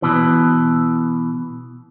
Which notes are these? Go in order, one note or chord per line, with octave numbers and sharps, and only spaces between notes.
B2 E3